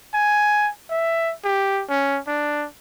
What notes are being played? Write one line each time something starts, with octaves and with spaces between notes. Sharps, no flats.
G#5
E5
G4
C#4
D4